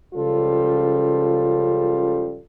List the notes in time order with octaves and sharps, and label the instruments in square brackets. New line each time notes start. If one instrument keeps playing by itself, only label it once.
[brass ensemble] C#2 C#3 F3 G3 F4 A4